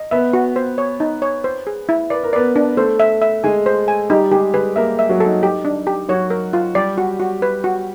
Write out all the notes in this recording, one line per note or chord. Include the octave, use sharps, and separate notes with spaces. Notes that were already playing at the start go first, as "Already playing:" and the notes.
Already playing: D#5
B3 B4 E5
F#4
C5
C#5
D#4
C#5
C5
G#4
E4
B4 D5
A#4
B3 B4 D5
D4
A3 A4 C5
E5
E5
G#3 G#4 G#5
C5
G#5
G3 D#4 G4
G#3 G4 G#4
G#3 G#4 B4
A#3 A#4 E5
E5
F#3 F#4
A4
D#4
G4
D4
G4
F#3 F#4 C#5
A#4
F4
G3 G4 D5
F#4
F#4
B4
F#4